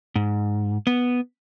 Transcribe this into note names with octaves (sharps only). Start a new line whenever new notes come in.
G#2
B3